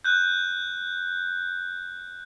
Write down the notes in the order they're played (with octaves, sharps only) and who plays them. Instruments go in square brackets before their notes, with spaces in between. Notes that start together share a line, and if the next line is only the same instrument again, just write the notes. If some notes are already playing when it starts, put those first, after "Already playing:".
[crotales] F#6 G6